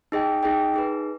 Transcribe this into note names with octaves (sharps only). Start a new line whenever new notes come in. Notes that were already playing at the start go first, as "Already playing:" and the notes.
D#4 G#4 D#5 G5
D#4 G#4 D#5 G5
D#4 G#4 B4